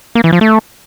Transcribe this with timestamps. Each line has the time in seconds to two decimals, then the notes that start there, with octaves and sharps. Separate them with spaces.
0.15 A#3
0.24 E3
0.33 F3
0.41 A3